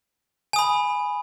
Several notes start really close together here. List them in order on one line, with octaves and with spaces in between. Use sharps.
G#5 D#6 B5